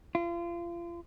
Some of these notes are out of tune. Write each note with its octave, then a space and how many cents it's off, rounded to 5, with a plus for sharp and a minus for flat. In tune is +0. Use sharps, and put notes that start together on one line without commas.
F4 -35